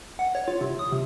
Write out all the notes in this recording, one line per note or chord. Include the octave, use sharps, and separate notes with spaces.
F#5
C#5
F4
C3
D#6
C3